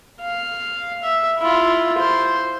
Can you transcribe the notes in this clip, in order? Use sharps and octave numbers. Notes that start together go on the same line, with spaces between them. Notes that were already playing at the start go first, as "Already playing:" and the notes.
F5
E5
E4 F4
C5